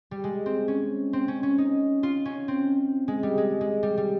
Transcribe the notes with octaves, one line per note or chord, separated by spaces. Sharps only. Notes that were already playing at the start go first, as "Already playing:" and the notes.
G3
G#3
C4
C#4
C4
C#4
C#4
D#4
F4
C#4
C4
G#3
G3
G#3
G#3
G3
G3